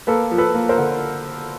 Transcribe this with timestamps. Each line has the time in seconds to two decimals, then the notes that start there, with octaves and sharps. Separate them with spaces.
0.07 A#3 A4 B4
0.31 F3
0.38 A4 B4
0.54 A#3
0.69 A#4 C5
0.77 D3